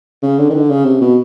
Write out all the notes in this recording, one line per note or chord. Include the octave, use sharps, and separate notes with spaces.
C#3
D3
D#3
D3
C#3
C3
B2